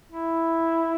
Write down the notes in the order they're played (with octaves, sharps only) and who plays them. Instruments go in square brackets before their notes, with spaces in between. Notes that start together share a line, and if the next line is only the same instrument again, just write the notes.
[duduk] E4